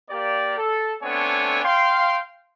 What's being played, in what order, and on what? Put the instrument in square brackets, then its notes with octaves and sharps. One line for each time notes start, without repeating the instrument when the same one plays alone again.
[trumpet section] A#3 G4 D5
A4
A3 B3 C4 D4 C#5 G#5
F5 G5 C6